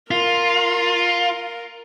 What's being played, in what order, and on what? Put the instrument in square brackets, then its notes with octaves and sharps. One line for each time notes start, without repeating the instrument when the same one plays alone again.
[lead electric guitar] F4 [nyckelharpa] A#4